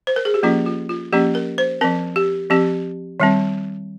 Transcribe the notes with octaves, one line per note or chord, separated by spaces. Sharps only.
C5
A#4
G#4
G4
F3 A#3 C#4 F4
F4
F4
F3 A#3 C#4 G4
A#4
C5
F3 C4 A#4
G4
F3 C4 G4
D#3 G3 C4